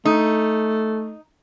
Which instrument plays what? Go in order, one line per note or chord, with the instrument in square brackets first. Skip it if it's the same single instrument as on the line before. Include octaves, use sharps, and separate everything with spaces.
[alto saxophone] A3 [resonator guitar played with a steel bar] D#4